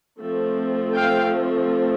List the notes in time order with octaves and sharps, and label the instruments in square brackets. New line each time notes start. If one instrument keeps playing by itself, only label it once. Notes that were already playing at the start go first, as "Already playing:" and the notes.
[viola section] F3 A3 C4
F5 G5